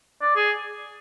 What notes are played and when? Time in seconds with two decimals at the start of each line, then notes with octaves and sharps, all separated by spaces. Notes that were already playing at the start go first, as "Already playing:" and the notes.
0.22 D5
0.36 G#4